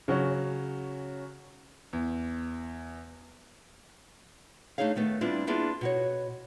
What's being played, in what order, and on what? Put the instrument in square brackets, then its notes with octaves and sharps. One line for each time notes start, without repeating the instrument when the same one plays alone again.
[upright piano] C#3 F#3 C#4
[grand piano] E2
[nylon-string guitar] A3 D4 D#4 G#4 C#5 F5
D#3 A3 B3
G3 B3 C4 D4 E4 F4
A#3 B3 D4 E4 F4 G#4
B2 F#4 C#5